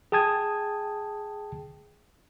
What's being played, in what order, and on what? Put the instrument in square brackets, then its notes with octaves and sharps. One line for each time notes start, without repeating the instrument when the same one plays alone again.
[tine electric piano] G#4 G5 A5 D#6 G#6